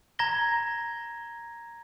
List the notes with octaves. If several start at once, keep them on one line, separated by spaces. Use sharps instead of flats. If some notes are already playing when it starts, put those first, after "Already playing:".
A#5 G#6 A#6 G7